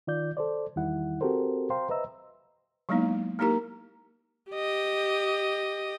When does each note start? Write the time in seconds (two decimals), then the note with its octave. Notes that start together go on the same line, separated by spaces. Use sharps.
0.07 D#3 F4 D5 G6
0.37 A4 C5 D5
0.76 E2 D#3 G3 E4 F#5
1.21 C4 F#4 G4 A4 A#4 C5
1.70 C5 F5 G5 A#5 C6
1.89 B4 C5 D#5 E5 A#5 E6
2.89 F#3 G#3 A#3 B3 D#4 E4
3.39 A#3 D#4 E4 G4 A#4 A#5
4.51 G4 D#5